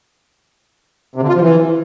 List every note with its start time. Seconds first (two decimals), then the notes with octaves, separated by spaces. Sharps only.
1.16 C3
1.22 D3
1.29 F4
1.35 F3
1.42 E3